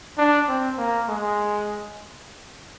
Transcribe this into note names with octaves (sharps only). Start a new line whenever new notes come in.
D4
C4
A#3
G#3